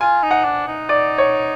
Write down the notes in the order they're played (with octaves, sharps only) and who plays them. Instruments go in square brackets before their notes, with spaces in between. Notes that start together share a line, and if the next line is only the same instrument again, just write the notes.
[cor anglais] F4 [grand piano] G#5
[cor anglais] D#4
[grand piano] F#5
[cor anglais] D4
D#4
[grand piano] D5
C#5